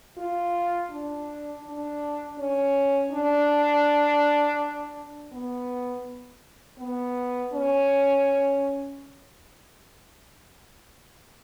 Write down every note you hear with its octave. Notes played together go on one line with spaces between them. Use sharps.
F4
D4
D4
C#4
D4
B3
B3
C#4